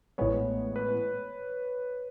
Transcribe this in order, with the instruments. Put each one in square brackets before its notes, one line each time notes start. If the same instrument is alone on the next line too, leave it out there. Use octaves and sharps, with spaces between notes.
[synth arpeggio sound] A1 A2 G#3 B3 [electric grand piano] C#5
[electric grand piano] B4